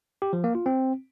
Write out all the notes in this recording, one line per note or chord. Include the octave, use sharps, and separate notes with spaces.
G4
F3
A#3
F4
C4